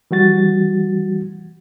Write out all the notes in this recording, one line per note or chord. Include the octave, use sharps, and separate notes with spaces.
E3 G3 F#4 A6